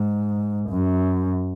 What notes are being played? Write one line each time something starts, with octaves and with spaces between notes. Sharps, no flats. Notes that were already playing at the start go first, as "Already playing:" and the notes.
Already playing: G#2
F#2